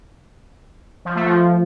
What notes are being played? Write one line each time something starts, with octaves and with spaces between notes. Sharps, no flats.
F3
A3
F3